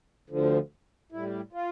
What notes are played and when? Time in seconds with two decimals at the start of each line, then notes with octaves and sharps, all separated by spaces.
0.30 D2 D3 F3
1.12 A2 G3 E4
1.53 F4